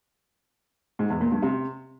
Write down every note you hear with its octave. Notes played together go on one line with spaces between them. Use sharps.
G#2
E2
A#2
G2
C3